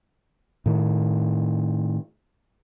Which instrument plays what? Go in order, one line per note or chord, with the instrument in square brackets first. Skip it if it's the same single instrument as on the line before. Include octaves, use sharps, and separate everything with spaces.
[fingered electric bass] A2 D#3